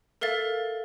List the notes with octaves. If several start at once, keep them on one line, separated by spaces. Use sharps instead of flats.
A4 A#4 E5 F5 A6